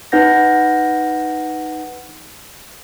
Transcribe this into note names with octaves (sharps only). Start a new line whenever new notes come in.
D#4 B4 F#5 G6 A#6